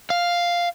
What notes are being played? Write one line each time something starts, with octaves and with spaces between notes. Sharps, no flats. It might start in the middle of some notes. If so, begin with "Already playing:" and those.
F5